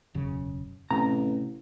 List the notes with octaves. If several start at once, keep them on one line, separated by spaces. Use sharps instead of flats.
E1 F#2 C#3
A1 C3 A#5